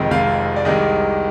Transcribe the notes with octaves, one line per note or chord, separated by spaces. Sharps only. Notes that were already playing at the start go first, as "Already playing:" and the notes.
Already playing: F1 F2 D#3 G#3 D#5
F1 F2 D#3 G#3 F5
D5
C2 C3 D#3 G#3 D#5